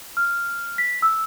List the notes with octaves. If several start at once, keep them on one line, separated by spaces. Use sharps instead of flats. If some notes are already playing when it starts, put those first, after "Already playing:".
F6
B6
E6